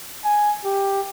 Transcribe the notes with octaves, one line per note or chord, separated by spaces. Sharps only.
G#5
G4